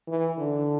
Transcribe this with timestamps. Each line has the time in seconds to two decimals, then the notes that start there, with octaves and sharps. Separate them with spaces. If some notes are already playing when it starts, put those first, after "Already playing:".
0.08 E3
0.38 D3